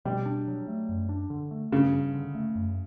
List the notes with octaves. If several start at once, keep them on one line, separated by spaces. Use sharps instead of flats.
B2 G3
D4
F#3
A3
F#2
D4
D3
A3
G2 C#3
G2
D3
A3
F#2